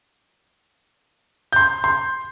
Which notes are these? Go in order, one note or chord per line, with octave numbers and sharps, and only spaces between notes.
C6 G6
C6